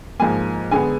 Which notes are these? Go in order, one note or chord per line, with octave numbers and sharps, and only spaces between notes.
G#2 F3 A#3 G#5
D3 G#3 B3 G#5